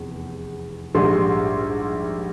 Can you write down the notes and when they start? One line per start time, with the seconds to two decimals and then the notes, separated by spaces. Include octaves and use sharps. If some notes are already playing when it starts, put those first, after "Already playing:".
Already playing: F1 E2
0.95 A#1 G#2 G3 C6